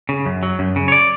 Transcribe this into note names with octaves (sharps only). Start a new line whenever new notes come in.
C#3
F#2
F#3
F#2
C#3
C#5
D5